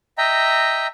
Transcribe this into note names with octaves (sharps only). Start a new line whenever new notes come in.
D#5 E5 G5 A#5